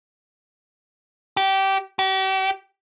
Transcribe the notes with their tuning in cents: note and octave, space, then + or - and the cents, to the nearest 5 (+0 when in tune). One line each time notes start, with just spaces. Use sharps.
G4 -20
G4 -40